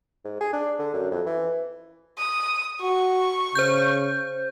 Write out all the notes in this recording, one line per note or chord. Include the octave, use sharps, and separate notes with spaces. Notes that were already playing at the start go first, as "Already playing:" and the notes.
G#2
G#4
D4
D3
F#2
F2
E3
D#6
F#4 C#6
C#3 C5 G6